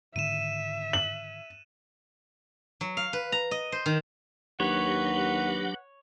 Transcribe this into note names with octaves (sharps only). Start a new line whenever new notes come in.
G#2 D3 D#3 E5 D#7 E7
F#7
F#3
F5
B4
A#5
D#5
C5
D#3
D#2 F#3 D4 G4 B4 C#5 F#5